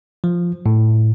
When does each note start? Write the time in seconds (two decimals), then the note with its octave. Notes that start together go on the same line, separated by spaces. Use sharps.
0.24 F3
0.66 A2